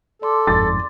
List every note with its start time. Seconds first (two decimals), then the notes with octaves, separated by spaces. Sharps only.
0.22 A4 D5 C6 D6
0.47 G1 F2 G#2 A6